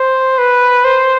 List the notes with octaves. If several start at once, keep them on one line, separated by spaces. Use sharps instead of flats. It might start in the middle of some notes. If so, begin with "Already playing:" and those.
Already playing: C5
B4
C5